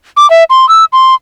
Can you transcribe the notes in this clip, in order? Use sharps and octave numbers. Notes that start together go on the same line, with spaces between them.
D6
E5
C6
E6
C6